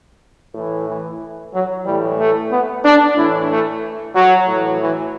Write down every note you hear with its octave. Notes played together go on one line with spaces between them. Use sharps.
A2 E3
E3
F#3
A2 E3 G3
A3
B3
D4
A2 E3 E4
A3
F#3
A2 E3
E3